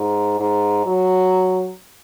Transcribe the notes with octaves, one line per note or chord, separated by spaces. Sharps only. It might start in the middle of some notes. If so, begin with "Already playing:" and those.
Already playing: G#2
G#2
F#3